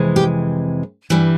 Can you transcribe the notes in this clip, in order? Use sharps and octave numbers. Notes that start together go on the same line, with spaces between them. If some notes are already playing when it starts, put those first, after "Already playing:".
Already playing: F2 C3 E3 G#3
G4
G2 E3 G3